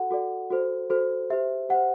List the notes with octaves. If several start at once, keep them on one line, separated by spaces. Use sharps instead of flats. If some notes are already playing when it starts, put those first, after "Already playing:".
Already playing: F#4 A4 F#5
F#4 A4 D5
F#4 A4 C5
F#4 A4 C5
G4 C5 E5
G4 C5 F#5